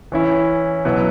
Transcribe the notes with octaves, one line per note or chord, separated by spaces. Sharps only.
E3 C#4 E4
B2 F#3 B3 E4